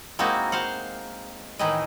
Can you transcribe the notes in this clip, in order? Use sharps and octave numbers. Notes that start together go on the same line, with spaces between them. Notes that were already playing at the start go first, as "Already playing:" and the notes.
G#3 A#3 C4 D#4 E4 F#4
C5 F5 F#5
A2 D#3 E3 E4 D#5